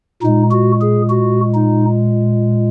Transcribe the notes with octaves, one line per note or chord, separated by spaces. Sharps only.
A#2 G#3 D#4
F#4
G#4
F#4
D#4